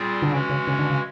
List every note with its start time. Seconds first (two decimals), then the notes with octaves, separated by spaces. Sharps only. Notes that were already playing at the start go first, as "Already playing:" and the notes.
Already playing: A#2 G3 C4 F4 G#4
0.22 D3
0.32 C#3 E3 G#3 C#4 F#4
0.49 C#3
0.67 C#3
0.79 D3
0.90 C#3